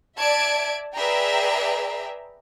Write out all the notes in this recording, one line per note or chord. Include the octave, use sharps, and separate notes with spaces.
D5 E5 A5 G#6 D7
G#4 B4 D5 E5 G5 A#5